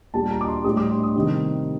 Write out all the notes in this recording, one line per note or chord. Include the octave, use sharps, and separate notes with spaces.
A#2 G3 A5
A#5
D6
C6
A2 G3 D#6
D6
C6
D#6
C3 D#3 G3